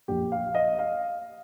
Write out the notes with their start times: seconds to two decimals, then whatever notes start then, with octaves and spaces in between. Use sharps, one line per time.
0.08 A#1 A#2 G4
0.32 F5
0.55 D#5
0.79 F5